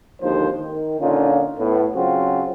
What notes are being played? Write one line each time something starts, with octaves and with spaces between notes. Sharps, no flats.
G#1 D#2 D3 D#3 F3 C5
D#3
A#2 D3 C#4 D#4 F4
A2 B3
C#3 F#3 C4 F4 F#4